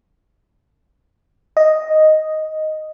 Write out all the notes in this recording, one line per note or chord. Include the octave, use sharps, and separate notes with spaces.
D#5